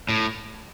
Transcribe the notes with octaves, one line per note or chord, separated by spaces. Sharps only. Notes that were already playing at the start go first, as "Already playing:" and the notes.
A2